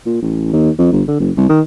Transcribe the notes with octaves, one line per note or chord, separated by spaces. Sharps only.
A#2
A1
D#2
F2
G1
D3
F#1
C2
D#3